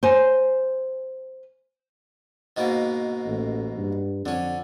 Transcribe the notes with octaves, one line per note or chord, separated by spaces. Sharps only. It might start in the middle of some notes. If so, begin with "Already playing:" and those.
C5 G#5
G#2 B2 A#3
A1
G2
F2 D3 C#4